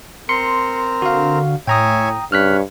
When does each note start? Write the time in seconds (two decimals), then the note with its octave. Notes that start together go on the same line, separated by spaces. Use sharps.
0.29 C4 A#4 C6 C#7
1.02 D3 F#4 F5
1.67 A2 C#5 E5 G5 G#5 A#5 D#6
2.32 G2 C#3 C#5 F6 F#6 B6